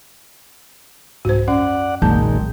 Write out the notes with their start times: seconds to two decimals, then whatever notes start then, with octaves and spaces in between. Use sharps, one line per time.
1.25 C2 G#2 F#4 C5
1.48 F#2 C#4 D5 F#5
2.02 F#1 B1 A#2 D#3 G#3 A5 G6